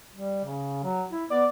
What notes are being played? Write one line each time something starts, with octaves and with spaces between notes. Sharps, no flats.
G3
C#3
F#3
E4
B3 D5